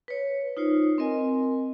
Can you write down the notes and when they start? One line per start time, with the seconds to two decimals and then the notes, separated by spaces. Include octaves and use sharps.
0.08 B4 C#5
0.57 D#4 F4 C5 C#5
0.98 C4 A#4 D#5 G#5